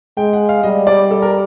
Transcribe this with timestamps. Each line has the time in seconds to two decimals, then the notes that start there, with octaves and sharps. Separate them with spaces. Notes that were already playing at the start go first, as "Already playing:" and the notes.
0.17 G#3 G5
0.33 F#5
0.49 F5
0.63 G3 D#5
0.87 D5
1.11 A4
1.22 A#4